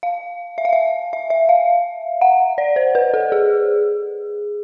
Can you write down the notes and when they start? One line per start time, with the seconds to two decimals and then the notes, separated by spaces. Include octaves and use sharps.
0.03 F5
0.58 E5
0.65 F5
0.73 E5
1.13 E5
1.30 E5
1.49 F5
2.21 F#5
2.58 D5
2.76 C5
2.95 B4
3.14 A4
3.32 G#4